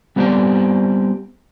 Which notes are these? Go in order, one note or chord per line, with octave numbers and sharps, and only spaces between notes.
G3 B3 C4 G4 C5 D5